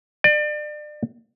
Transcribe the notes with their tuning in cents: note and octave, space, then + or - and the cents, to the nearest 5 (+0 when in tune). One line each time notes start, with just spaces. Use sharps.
D5 +35